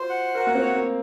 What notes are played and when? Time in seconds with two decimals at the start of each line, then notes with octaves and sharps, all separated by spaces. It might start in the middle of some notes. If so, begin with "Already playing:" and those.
Already playing: F4 F#4 C5
0.09 F#5
0.35 F#4 A#4
0.47 A#3
0.55 C4
0.62 C#5
0.74 A#3